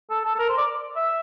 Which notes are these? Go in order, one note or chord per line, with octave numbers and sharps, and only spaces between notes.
A4
A4
A4
A#4
C5
D5
E5